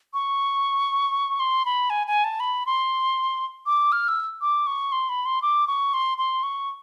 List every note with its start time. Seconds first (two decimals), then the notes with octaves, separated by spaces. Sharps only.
0.14 C#6
1.40 C6
1.65 B5
1.90 G#5
2.07 G#5
2.24 A5
2.40 B5
2.66 C6
3.66 D6
3.92 F6
4.08 E6
4.41 D6
4.67 C#6
4.92 C6
5.09 B5
5.26 C6
5.42 D6
5.67 C#6
5.94 C6
6.18 C6
6.43 C#6